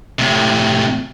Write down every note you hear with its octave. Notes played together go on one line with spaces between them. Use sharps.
A2 C3